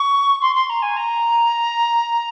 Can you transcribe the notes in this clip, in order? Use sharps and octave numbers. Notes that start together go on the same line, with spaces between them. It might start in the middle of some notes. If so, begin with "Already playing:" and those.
Already playing: C#6
C6
C6
A#5
G#5
A#5